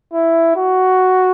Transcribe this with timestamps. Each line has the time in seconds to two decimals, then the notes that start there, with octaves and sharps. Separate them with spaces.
0.13 E4
0.56 F#4